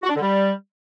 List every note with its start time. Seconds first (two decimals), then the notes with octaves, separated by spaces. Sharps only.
0.03 F#4
0.09 D4
0.15 D3
0.21 G3